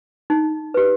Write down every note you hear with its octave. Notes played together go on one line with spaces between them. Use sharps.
D#4
G4 B4